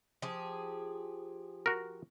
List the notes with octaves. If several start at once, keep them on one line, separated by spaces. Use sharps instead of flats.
F3 G4 G#4
F#4 A#4